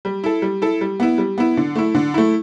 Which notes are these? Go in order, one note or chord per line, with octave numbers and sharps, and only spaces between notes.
G3
E4 A4
G3
E4 A4
G3
B3 E4
G3
B3 E4
D3
A3 E4
D3
A3 E4